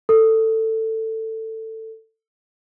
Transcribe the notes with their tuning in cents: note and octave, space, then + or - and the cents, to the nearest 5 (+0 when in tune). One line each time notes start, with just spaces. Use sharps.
A4 +15